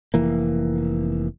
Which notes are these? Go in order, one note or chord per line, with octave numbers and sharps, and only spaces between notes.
F1 E3 A#3